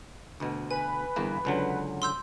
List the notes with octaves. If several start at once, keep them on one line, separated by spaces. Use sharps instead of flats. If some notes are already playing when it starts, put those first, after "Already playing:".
D2 B2
B4 G#5
G1 E2 A#3
C#2 D3 F#3
C6 E6 G6